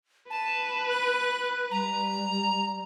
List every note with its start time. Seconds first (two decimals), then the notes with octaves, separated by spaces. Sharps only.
0.30 B4 A5
0.89 F#6
1.71 G3 A#5